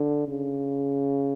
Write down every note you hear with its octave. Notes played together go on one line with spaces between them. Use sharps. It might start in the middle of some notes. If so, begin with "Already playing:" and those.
Already playing: D3
C#3